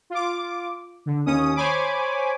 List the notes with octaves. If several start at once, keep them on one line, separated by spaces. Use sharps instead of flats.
F4 D6
D3
D#2 C#4 D#6
C5 C#5 G#5 B5 D6